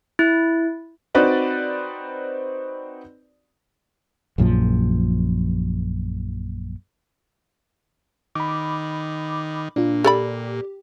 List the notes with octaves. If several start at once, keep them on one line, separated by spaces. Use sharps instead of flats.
E4
C4 D#4 F#4 B4 D5
A#1 F#2 A#2 F3
D#3 B5 D6
A#2 D4 F4
G4 A4 D5 B5